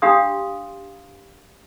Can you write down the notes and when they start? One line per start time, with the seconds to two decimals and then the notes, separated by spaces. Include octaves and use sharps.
0.02 D4 G4 F5 C6 D#6